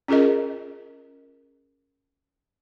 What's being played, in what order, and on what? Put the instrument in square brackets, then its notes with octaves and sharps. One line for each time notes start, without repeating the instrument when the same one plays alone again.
[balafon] C#4 F4 G#4 A#4 D#5